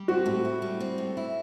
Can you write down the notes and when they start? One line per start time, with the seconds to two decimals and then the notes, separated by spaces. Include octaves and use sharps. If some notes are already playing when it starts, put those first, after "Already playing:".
Already playing: G3
0.08 C4 F#4
0.26 A2
0.45 E4
0.62 G3
0.80 C4
0.98 A2
1.17 E4